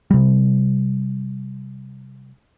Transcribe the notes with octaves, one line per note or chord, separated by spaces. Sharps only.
C3 G3